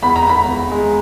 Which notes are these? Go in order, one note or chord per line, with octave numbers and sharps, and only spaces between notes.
E2 B5
A#5
E2 B5
E2
G#3